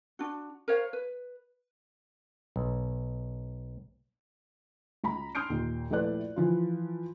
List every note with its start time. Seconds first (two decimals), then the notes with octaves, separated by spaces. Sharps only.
0.19 D4 F#4
0.68 A#4 C5 C#5 F5
0.93 B4
2.56 B1
5.04 C#2 A#5 B5
5.35 C6 D#6 F6 G6 C7 D7
5.50 D#2 A#2
5.90 A#1 A3 E4 B4 D5 F#6
6.36 E3 F3 F4